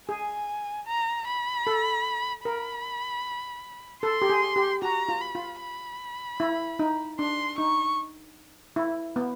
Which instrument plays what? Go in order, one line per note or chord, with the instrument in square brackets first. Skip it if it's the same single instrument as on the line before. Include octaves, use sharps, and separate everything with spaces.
[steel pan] G#4 [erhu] G#5
[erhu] A#5
B5
[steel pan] A4
[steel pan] A#4 [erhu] B5
[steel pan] A4 [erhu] C6
[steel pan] G4
G#4
G4
[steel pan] F#4 [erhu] A#5
[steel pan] F4
[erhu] B5
[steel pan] F4
[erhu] B5
[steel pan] E4
D#4
[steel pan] D4 [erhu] C6
[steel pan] D#4 [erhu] C#6
[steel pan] E4
B3